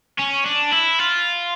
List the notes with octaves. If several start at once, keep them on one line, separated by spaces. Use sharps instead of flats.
C#4
D4
E4
F4